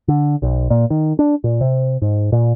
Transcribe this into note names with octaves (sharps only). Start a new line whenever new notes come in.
D3
B1
A#2
D#3
D4
A#2
C3
G#2
A#2